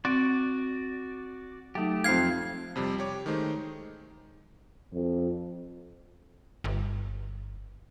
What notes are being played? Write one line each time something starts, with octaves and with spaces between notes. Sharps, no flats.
C4 F#4 D5
F#3 A3 D#4 G4
F2 C4 F5 G#6 C7
F2 C3 G3
G4 C#5 D6
D#3 G#3 A3 D#4 C5
F2
G1